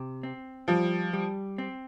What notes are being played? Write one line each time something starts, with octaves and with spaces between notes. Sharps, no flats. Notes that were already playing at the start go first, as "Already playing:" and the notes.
Already playing: C3
C4
F3 G3
G3
C4